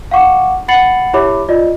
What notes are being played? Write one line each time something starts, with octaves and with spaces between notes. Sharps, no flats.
F5 F#5 C#6 D6
F#5 B5 A6 C7 C#7 F#7
E4 G4 C#5 E5 B5 D6
F4 D5 D#5